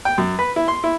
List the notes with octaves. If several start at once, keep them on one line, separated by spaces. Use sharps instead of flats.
G5
F#2
B4
E4
C6
E4